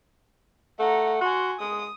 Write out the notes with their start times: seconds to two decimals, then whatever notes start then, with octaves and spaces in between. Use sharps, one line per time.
0.79 A3 F#5 A#5
1.21 F#4 G#5 C6
1.60 G#3 D#6